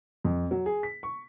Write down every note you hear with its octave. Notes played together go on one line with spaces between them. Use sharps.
F2
F#3
G#4
B6
C#6